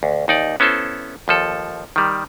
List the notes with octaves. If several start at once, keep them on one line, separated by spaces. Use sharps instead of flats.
D2
D#2 D#4 D5
B3 C#4 E4 A4 C5
D#2 F3 A4
D#3 G3